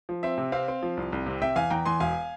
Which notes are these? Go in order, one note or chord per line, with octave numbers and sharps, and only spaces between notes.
F3
C4 E5
C3
C4 F5
C4
F3
C2
C2
C3
C3 E5 G5
E2 F5 G#5
E2 G5 A#5
E2 G#5 C6
E1 F5 G#5